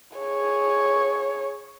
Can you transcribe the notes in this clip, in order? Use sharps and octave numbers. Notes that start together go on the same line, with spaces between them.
G#4 C#5